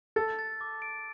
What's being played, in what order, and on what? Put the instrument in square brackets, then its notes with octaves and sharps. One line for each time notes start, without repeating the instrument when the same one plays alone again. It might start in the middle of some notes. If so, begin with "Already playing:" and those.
[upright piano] A4 [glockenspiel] A6
[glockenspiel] A6
D6
D7